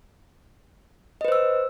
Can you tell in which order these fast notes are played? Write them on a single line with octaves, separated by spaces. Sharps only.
D#5 B4 C5 E6